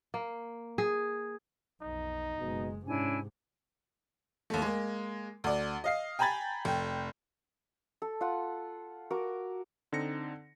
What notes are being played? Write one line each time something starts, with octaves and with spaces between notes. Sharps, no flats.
A#3
G#4
B1 F2 D#4
F#1 B2 G#3
G#2 C3 C#4 D4 E4 G#5
D#2 A3
G#3 A#3
D2 D5
D#5 F5 C7
G5 G#5 A#5 B5 G#6 A6
F1 G5
A4
F4 F#5
F#4 A#4 D6
D3 C4 D#4 A#6 C#7